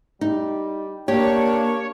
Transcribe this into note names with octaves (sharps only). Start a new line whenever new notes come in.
G3 D#4
A#3 D4 G4 C#5